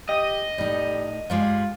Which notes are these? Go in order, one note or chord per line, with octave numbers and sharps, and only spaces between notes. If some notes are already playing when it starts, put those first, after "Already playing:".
G4 D#5
A2 G3 D#4
G2 G3 G#3 F4